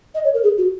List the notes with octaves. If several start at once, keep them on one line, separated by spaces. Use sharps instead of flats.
D#5
C#5
A#4
G#4
F#4